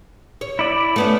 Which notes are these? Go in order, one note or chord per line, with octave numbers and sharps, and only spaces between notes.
C#5
E4 D5
A3 B3 C#4